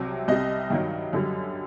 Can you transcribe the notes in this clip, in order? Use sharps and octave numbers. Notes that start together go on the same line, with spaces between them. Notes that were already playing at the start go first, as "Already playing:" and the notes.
Already playing: C2 C3 F#3
C2 C3 G3 D#5
G2 D#3 F#3
F#2 D3 G3